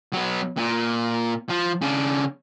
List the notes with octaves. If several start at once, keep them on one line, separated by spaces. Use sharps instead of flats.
F#3 B3
A#2
F3
C#3 D4